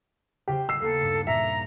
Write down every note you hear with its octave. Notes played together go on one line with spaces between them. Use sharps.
C#3 G4 C5
E6 C7
D#2 A#3 B3 A4
G2
A#2 E5 A#5